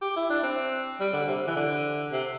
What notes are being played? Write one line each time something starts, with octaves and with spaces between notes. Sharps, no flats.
G4
E4
D4
C4
G3
D3
C3
E3
D3
C3